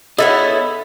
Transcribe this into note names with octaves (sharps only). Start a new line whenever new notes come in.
B3 D#4 E4 G#4 A4 C#5 D#5